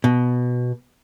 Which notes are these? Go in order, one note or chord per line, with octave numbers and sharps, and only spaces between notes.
B2